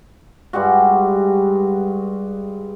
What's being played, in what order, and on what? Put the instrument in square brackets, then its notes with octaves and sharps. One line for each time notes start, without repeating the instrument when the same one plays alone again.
[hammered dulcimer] G2 G3 G#3 F#4